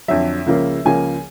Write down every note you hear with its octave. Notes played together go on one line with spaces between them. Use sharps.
F2 D3 F#3 E5
C#2 C#3 F3 A#3
C#2 C#3 F3 A#3 G#5